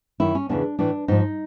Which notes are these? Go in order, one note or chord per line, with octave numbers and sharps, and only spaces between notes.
F#2 D#3 E4
C#4
E2 C#3 E3 D4
A2 E3 D4
G#2 F3 D#4